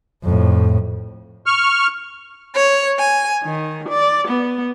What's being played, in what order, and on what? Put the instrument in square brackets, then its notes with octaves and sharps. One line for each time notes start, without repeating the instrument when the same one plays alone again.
[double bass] F2 A2
[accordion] C#6 F6
[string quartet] C#5
G#5
D#3
D5
B3